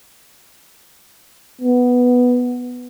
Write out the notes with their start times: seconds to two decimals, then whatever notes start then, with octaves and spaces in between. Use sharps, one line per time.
1.61 B3